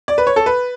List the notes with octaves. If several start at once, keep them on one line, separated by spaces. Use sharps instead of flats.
D5
B4
C#5
A4
B4